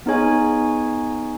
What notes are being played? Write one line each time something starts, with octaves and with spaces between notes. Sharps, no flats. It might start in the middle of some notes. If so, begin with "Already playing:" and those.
B3 D#4 G#4 C#5 G#5